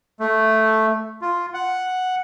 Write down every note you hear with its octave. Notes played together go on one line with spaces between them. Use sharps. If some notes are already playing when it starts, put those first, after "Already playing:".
A3
F4
F#5